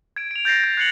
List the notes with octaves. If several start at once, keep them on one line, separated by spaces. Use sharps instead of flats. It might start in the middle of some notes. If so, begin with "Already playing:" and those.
G#6 D7
D7 F7
G6 A6 A#6 C7
G#6
F#6 G#6 C7 C#7 F#7